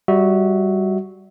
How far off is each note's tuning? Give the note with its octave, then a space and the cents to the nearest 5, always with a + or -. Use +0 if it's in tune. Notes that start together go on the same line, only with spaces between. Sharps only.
G3 +0 F#4 +0 E5 -25